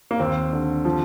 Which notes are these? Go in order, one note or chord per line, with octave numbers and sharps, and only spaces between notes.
A#3
D#2 C4
D3
F3